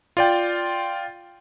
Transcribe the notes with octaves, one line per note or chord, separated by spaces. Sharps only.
F4 D5 G5